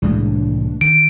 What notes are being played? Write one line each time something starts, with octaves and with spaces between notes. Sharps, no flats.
C2 A2 E3 G#3 A#3 D4
D#3 D7